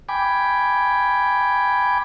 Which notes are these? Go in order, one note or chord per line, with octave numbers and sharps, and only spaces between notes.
G5 G#5 B5 D6